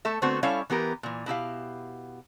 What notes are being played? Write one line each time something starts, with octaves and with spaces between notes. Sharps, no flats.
A3 A4 E5
D3 A3 B3 C4 F#4 C5
G3 C#4 E4 A4 C#5 F5
E3 B3 G4 A#4
A#2 E3
B2 E4 G4 F5